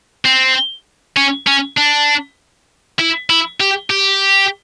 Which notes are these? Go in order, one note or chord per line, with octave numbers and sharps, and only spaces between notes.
C4
C#4
C#4
D4
E4
E4
G4
G4